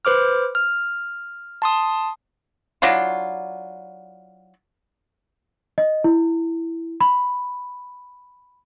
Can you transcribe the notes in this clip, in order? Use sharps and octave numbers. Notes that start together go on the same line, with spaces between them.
B4 C5 D6 F6
F6
A5 C6 D#6
F#3 D4 E4 F4
D#5
E4
B5